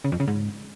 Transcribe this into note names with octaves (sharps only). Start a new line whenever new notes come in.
C#3
F2
C#3
G#2